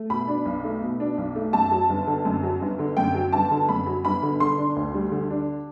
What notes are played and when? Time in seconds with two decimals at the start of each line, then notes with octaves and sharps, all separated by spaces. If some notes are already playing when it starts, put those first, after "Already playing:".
Already playing: A3
0.10 B2 B5
0.28 D4
0.45 B1
0.64 A3
0.82 B2
1.00 D4
1.18 B1
1.35 A3
1.53 F#2 A5
1.71 F#3
1.89 G1
2.07 D3
2.25 F#2
2.43 F#3
2.61 G1
2.79 D3
2.97 F#2 G5
3.15 F#3
3.32 G1 A5
3.51 D3
3.69 F#2 B5
3.86 F#3
4.05 G1 B5
4.23 D3
4.40 D3 C6
4.58 D4
4.76 D2
4.94 G3
5.12 D3
5.30 D4